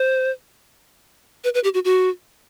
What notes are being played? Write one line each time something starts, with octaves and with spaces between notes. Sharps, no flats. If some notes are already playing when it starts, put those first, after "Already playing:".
Already playing: C5
B4
B4
G4
F#4
F#4